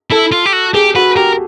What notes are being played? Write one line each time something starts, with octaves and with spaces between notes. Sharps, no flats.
E4 A4
F4
G4
F#4
G4 G#4
F#4 B4
G4 A#4